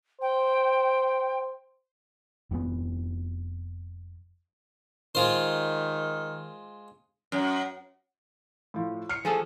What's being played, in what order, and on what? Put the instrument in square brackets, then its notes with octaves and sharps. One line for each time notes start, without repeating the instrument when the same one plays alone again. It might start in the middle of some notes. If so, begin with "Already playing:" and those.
[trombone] C5 [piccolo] G5
[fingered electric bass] F1 F2 C3 B3
[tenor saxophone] D#3 [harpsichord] G#3 F4 C5
[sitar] F#2
[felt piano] A2 F3
F6 C7 C#7
[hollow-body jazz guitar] F3 G#4 A4